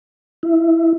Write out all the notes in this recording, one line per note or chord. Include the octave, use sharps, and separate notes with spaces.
E4